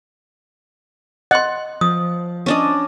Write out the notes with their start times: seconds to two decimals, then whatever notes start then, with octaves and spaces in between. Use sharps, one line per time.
1.31 D#5 F#5 C6
1.81 F3 D#6
2.46 C#4 D4 D#5